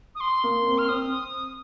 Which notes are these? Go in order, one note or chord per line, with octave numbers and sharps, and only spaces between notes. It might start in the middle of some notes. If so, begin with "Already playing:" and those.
D#6
C6
A#3
C4
F6
C4 D#6